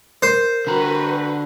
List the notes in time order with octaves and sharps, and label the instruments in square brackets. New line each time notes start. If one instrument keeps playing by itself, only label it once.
[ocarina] A#4 [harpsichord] C5
[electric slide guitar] D3 A#5 [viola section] F#4 B4